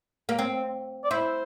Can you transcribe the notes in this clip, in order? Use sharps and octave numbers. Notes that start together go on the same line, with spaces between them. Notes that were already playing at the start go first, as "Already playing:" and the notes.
A#3
C4
D5
E4 C5